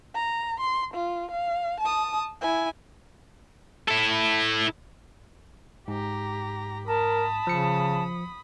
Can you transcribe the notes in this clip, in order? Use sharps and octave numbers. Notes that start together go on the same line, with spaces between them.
A#5
C6
F4
F5
A5 D#6
E4 G#5
E4 A4
G#2 G4 A#5
A#4 A5 B5 D#6
C#3 F3 C#7